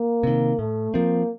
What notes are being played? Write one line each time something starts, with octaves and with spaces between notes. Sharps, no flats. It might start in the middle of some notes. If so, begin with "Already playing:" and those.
Already playing: A#3
C3 D#3
A2 A3
F3 A#3 C4